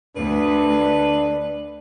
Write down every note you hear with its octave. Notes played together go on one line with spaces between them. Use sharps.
D2 D4 B4